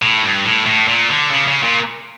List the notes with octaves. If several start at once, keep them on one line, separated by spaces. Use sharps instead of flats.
A2
G2
A2
A2
A#2
D3
C#3
C#3
A#2